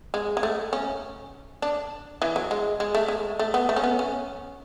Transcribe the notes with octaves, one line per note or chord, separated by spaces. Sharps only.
G#3
G#3
A3
C#4
D4
E3
F#3
G#3
G#3
A3
G#3
A3
B3
A3
C#4
B3
C#4